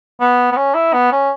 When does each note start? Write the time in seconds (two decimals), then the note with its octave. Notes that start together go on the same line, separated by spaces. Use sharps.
0.21 B3
0.52 B3
0.57 C#4
0.74 E4
0.93 B3
1.12 C#4